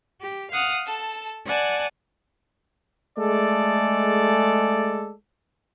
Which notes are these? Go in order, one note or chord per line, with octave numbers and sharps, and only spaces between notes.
G4
F5 F#5 D#6 F6
A4 A5
D5 F#5 G#5 A5
G#3 A3 G#4 A4 D5